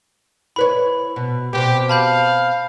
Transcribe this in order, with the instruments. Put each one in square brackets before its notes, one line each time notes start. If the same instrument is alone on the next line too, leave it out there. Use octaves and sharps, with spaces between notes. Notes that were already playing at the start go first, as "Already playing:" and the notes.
[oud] E4 B4 C#5 [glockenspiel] B5
[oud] B2
[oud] B2 C4 [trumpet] G4
[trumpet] F5 [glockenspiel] A5 B5 G6